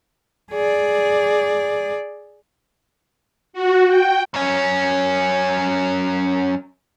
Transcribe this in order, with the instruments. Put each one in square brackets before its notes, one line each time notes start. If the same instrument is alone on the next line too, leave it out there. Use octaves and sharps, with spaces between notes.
[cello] G#4 D5
[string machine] F#4
G5
[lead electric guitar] F#2 C#4